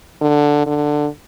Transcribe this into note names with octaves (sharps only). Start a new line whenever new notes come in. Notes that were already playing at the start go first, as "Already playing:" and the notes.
D3
D3